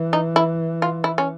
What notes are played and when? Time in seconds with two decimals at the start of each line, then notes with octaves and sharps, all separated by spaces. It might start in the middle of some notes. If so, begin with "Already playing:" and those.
Already playing: E3
0.13 D#4
0.36 E4
0.82 F4
1.04 E4
1.18 C#4